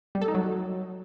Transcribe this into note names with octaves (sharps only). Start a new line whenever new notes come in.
G3
A4
D#4
F#3